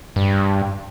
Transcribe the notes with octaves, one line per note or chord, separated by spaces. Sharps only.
G2